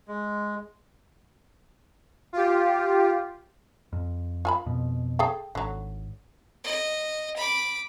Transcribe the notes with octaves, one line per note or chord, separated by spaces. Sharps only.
G#3
F4 G4
F2
F4 G#5 B5
F2 B2
G#4 A4 G5
G#1 D3 F#3
D#5
B5 D6